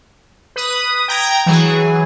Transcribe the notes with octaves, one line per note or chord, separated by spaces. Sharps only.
B4 D#6
G5 A#5 G#6
E3 F#3 G#4